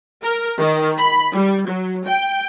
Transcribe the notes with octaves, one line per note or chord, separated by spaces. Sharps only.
A#4
D#3
B5
G3
F#3
G5